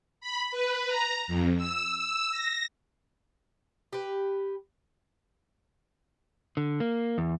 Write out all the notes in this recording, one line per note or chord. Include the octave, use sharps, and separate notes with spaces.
B5
B4
A#5
F2
E6
E6
A#6
G4 B4
D3
A#3
E2